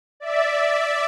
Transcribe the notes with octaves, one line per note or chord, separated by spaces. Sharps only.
D5 E5